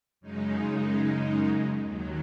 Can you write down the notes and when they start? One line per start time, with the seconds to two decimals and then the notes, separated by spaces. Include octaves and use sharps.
0.21 F#2 C#3 G#3 D#4
1.81 D#2 D#3 F#3